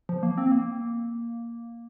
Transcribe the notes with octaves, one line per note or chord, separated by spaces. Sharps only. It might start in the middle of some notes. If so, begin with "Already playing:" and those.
F3
A#3
C4
A#3